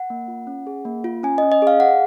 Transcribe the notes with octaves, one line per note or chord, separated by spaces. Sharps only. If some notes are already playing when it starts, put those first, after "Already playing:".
Already playing: F#5
A#3
F4
C#4
G#4
A#3
F4
C#4 G#5
C#4 D#5
D#5
G#4 F5
G#4 F#5